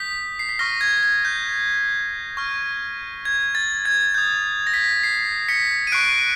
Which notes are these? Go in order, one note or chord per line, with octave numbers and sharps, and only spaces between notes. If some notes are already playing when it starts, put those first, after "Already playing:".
Already playing: D#6 G6 B6
C7
B6
C#6 F6 A#6
G#6
G#6
G6
C#6 F6
G#6
A6
G#6
D#6 G6 G#6
A#6
B6
C7
B6 C#7
D#7
C#6 F#6 C7 D7